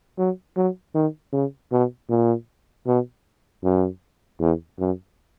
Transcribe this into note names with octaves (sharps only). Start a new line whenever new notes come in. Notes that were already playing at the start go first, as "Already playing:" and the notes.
F#3
F#3
D#3
C#3
B2
A#2
B2
F#2
E2
F#2